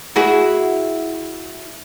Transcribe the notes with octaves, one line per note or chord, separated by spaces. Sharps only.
E4 F#4 G#4